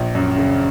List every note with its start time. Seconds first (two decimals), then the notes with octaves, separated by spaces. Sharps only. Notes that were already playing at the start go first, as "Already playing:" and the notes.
Already playing: A#1
0.15 F#2
0.37 C#3